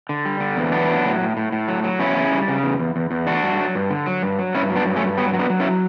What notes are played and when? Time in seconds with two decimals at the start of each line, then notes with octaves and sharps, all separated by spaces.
0.09 D3
0.25 G3
0.40 D3
0.57 E2
0.72 F#3 B3 D4
0.89 F#3
1.05 A2
1.21 A2
1.37 A2
1.52 A2
1.68 F#3
1.84 F#3
1.99 E2 C#4 E4
2.16 C#3
2.32 G3
2.48 C#3
2.64 E2
2.79 E2
2.96 E2
3.11 E2
3.27 D3 D4 F#4
3.43 G2
3.60 F#3
3.75 G2
3.90 D3
4.06 F#3
4.22 G2
4.39 F#3
4.55 G2 C#4 E4
4.70 F#3
4.76 B3 D4
4.86 G2
4.96 A3 C#4
5.02 G2
5.18 F#3 G3 B3
5.33 F#3
5.39 B3 D4
5.50 F#3
5.60 C#4 E4